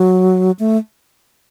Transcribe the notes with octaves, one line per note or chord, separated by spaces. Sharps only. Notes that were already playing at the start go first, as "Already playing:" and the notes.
Already playing: F#3
A3